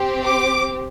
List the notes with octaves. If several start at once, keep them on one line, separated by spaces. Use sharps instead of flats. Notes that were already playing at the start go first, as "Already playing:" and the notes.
Already playing: C4 G4
D6